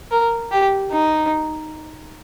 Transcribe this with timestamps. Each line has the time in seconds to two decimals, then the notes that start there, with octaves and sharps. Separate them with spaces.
0.11 A#4
0.52 G4
0.92 D#4